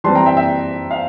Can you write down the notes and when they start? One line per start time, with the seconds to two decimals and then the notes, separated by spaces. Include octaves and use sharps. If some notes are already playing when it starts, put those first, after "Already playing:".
0.04 E3 G3 C4 A5 C6
0.15 G5 A#5
0.26 E5 G5
0.37 E5 G5
0.91 F5